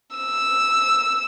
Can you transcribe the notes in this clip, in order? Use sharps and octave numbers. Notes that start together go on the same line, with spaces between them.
E6